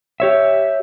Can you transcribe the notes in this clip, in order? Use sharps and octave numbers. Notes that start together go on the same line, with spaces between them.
G4 C#5 E5